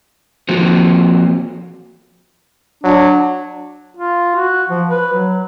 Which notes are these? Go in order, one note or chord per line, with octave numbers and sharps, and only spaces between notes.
F3 A#3 C4 F4 F#4
F#3 D4
F4
F#4
F3
B4
F#3